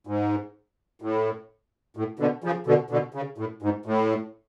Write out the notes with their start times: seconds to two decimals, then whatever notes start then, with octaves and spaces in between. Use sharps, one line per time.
0.07 G#2
1.02 A2
1.97 A2
2.19 B2 D3
2.44 C#3 F3
2.67 B2 D3
2.90 B2 D3
3.14 C#3
3.38 A2
3.62 G#2
3.86 A2